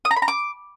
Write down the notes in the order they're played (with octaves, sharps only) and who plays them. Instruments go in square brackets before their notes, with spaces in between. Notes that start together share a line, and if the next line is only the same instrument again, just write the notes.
[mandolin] D#6
A#5
B5
A#5
D6